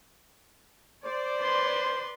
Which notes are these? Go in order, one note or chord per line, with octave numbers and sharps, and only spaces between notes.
C5 D5
B4 C6